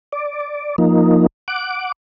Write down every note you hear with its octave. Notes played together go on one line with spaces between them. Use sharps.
D5
F3 A#3 D#4
F#5 D6